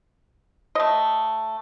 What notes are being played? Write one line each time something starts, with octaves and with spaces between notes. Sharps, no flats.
A3 D#5